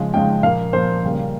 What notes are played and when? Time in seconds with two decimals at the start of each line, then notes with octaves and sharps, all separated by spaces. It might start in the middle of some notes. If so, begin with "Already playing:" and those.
Already playing: C#3 F3 G#3
0.14 C#3 F3 G#3 G5
0.43 A#2 F3 A#3 F5
0.73 A#2 F3 A#3 C5
1.03 C#3 G3 A#3